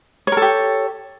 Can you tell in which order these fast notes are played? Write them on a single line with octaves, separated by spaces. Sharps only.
C#5 A#4 A4 G4